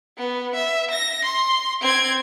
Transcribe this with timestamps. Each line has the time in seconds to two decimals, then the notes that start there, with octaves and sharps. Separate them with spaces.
0.18 B3
0.55 E5
0.91 A#6
1.25 C6
1.81 C4 G#6